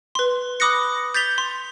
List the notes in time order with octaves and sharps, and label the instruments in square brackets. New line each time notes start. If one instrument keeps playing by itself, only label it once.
[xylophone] B4 C6
B5 D6 D#6 F#6 A#6 C#7
G6 A6 B6 F7 G7
C6